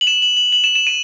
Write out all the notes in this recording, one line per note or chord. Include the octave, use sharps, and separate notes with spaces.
F#7
E7
F#7
F#7
F#7
E7
E7
D#7